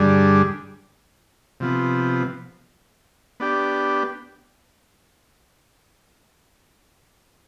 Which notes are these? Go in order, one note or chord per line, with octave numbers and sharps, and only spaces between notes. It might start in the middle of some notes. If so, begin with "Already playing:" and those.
Already playing: G2 D3 G3 D4 G#4
C3 F3 B3
B3 D4 G4